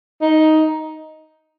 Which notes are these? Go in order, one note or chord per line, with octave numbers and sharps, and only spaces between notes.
D#4